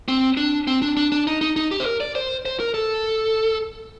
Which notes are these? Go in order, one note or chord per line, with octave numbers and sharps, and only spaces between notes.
C4
D4
C4
D4
D4
D4
D#4
D#4
D#4
G4
C5
A#4
D5
C5
C5
A#4
A4